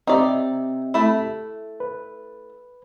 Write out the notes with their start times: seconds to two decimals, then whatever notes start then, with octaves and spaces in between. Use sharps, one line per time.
0.07 C4 D#4 G4 D5 E5
0.94 A3 E4
1.80 B4